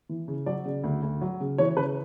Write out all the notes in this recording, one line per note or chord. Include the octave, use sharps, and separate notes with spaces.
E3
C#3
F#3 D5
C#3
D2
D2
F#3
C#3
E3 C#5
C#3 B4